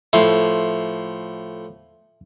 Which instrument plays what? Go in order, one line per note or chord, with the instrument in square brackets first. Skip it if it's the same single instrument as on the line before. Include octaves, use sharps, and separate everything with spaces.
[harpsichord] A2 F3 C6 [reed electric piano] E5